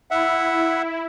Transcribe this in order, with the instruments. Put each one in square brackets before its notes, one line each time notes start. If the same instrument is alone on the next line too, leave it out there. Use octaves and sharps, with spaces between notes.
[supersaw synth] E4 [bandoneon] E5 F#5